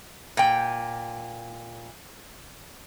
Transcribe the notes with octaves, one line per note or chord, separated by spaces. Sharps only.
A#2 G5